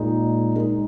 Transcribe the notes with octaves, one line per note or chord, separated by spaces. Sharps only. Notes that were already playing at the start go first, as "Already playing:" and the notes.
Already playing: A#2 G#3 D#4
G#3 D#4 A#4